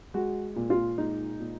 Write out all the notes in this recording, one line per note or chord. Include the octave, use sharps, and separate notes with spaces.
G#3 F#4
A#2
F4
G#3 D#4
A#2